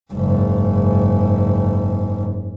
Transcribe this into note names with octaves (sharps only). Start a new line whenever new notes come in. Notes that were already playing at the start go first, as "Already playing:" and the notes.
F#1 G#2